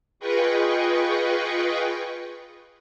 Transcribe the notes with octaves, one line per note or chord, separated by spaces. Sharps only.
F4 G#4 B4 D#5 G5 C#6